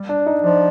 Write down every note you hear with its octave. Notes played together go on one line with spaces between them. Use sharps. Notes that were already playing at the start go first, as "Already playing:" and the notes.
Already playing: G3
D4
D#4
F3 D4